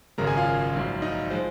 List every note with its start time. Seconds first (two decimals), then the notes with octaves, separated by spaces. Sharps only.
0.18 G#1 F#2 C#3 G#3 A#4 A#5
0.27 G#4 G#5
0.37 F4 F5
0.75 A#1 G#2 F#3
1.02 D#4 D#5
1.30 F3 G#3 C5